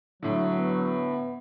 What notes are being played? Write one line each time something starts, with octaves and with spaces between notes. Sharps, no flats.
A2 D3 F#3
B3